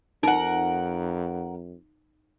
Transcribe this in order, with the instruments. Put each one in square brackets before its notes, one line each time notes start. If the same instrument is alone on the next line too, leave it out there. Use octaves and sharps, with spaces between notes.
[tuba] F2 [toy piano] D#4 [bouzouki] A#4 F#5